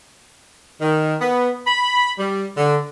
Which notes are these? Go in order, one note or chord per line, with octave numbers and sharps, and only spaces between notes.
D#3
B3
B5
G3
D3